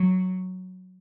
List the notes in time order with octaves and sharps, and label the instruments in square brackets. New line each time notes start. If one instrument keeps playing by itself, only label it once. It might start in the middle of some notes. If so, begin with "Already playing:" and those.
Already playing: [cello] F#3